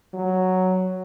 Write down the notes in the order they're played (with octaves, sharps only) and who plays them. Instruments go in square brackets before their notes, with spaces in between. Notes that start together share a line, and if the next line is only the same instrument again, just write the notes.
[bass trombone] F#3